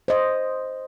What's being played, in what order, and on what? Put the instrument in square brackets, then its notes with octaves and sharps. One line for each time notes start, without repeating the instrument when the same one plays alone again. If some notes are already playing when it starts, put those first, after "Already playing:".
[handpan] C5 D#5